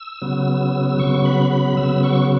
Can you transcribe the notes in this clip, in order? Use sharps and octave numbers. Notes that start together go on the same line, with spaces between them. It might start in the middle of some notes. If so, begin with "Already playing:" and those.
Already playing: E6
C#3 F#3 B3
E6
C#3 F#3 B3 C#6
B5
B5
C#3 F#3 B3 E6
C#6